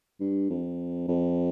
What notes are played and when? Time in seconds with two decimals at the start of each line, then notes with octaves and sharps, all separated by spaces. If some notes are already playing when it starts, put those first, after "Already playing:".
0.20 G2
0.50 F2
1.08 F2